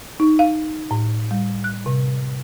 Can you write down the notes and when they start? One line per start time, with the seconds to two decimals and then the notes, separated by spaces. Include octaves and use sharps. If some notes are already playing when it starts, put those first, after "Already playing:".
0.20 D#4
0.39 F5
0.91 A2
1.31 G3
1.64 F#6
1.86 C3